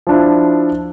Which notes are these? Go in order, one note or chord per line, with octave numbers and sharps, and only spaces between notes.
F3 D4 E4